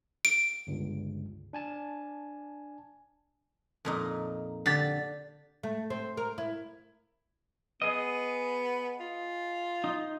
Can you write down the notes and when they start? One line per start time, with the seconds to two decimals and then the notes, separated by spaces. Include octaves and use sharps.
0.25 D7
0.67 G1 C#2 G2
1.53 D4 G#5 A5
3.85 F2 A#2 D#4
4.66 D3 G4 A6 B6
5.63 A3
5.90 C4
6.17 A#4
6.38 E4
7.82 B3 G#4 D#5
9.00 F4
9.84 D#4